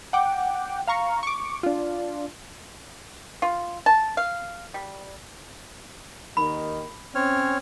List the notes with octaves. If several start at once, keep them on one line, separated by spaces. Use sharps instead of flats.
F#5 G5 D6
F5 A#5 C#6
C#6 D6
D4 F4
F4
A5
F5
G3
D#2 D#3 B5
C4 C#4 C#5 F6